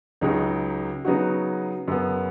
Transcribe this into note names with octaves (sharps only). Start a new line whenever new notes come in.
C#2 C#3 F#3 D#4 F#4
C#3 F#3 B3 D#4 F#4
F#2 C#3 B3